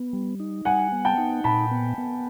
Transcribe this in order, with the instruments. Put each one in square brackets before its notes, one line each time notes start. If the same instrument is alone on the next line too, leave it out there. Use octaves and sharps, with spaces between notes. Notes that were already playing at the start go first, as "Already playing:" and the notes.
Already playing: [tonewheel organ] B3
G3
D#4
[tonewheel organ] G3 [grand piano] F#5 G#5
[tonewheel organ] B3
[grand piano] G5 A5
[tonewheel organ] D#4
[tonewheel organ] A#2 [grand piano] A5 B5
[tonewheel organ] B3
B3